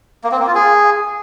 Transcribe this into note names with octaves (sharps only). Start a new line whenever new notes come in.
A#3
C4
A#3
F4
G#4